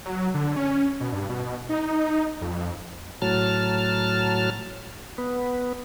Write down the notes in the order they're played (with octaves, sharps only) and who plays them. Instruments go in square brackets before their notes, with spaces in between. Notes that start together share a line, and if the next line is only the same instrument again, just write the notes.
[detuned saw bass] F#3
D3
C#4
B2
G2
B2
D#4
F2
[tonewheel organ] A2 F#3 A5 F6
B3